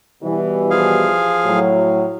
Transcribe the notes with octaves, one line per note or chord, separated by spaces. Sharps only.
B2 E3 G3
F3 G#4 F5
A2 F#3